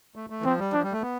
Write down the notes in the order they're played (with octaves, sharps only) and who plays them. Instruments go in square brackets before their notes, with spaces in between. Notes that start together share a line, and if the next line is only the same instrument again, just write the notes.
[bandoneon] A3
A3
E3
[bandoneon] F3 [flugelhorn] C4
[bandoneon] G3
[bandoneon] F3 [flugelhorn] D4
[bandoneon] G3
A3
B3